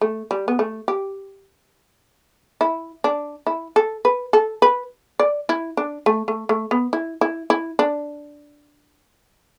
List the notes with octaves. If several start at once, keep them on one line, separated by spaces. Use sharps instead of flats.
A3
G3
B3
A3
G4
E4
D4
E4
A4
B4
A4
B4
D5
E4
D4
A3
A3
A3
B3
E4
E4
E4
D4